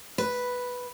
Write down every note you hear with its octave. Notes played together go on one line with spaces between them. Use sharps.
B4